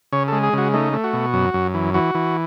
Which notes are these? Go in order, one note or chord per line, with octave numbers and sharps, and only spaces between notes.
C#3 C#5
G#3 A4
G#4
C#3 F#4
A3 D#4
A3
F#4
B2
F#2
F#2
E3
E3 F#4
E3